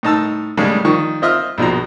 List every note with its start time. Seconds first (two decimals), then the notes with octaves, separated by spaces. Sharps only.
0.03 A2 D#4 A5 E6
0.57 A2 C#3 G3 G#3
0.85 D#3 F3 C#6
1.22 C4 F4 D#5 E5 D#6 F6
1.58 A#1 B2 F3 A#5